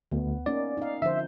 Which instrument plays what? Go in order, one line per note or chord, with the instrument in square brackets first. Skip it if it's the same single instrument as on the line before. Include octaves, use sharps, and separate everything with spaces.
[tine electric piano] D2 [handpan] B3
[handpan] A#3 C#4 D#4 [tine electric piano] D5
[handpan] D#4 F5
[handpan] D3 F3 C5 [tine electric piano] E5